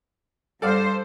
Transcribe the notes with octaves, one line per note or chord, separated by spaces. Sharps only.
G2 A4 C5 D5 F5